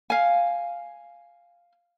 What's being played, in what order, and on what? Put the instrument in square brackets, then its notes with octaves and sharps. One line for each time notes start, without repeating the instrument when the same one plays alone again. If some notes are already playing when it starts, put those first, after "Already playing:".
[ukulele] F5 G#5